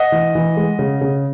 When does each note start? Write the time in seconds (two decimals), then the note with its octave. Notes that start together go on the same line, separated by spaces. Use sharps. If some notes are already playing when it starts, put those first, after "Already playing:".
Already playing: D#5 F#5
0.12 E3
0.35 E3
0.57 G#3
0.79 C#3
1.01 C#3